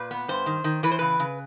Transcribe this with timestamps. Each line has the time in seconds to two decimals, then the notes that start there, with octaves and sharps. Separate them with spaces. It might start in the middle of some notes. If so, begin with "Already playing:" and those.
Already playing: A#2 B4
0.11 B3
0.28 G2 C5
0.46 D#3
0.64 D#3
0.83 E3 B4
0.91 C5
0.99 C#3 B4
1.20 C#3